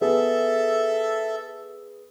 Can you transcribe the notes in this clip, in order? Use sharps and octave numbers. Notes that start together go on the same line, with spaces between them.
B3 G#4 A4 E5